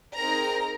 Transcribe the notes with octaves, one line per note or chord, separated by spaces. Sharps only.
C4 D#4 G#4 A#4 A#5